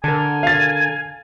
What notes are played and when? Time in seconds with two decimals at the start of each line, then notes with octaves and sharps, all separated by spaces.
0.04 D3 A4 A#4 G#5
0.43 F5 A6